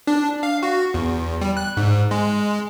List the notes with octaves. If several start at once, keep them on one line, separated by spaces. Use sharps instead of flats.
D4
F5
F#4
E2
G3
F#6
G#2
G#3